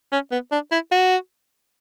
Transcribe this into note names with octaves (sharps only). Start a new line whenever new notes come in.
C#4
B3
D4
E4
F#4